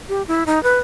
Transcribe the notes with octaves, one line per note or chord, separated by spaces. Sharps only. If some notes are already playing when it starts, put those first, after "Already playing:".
G4
E4
D#4
B4